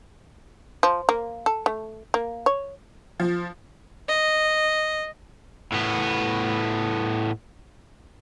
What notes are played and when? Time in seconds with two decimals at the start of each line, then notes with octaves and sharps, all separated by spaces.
0.83 F3
1.09 A#3
1.46 A4
1.66 A3
2.14 A#3
2.46 C#5
3.20 F3
4.08 D#5
5.72 A2 B3